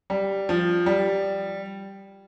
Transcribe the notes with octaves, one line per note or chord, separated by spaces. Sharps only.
G3
F3
G3